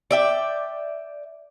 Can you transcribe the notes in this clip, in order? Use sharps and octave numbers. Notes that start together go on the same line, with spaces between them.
D5 E5 G5